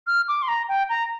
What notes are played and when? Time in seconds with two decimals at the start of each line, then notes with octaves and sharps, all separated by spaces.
0.07 F6
0.28 D6
0.42 C6
0.48 A#5
0.68 G5
0.89 A#5